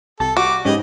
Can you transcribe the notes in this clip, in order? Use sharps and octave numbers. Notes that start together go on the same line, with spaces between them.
C2 G4 A4 A5
G3 F#4 D6
G#2 C#4 G4 G#4 B4 D#5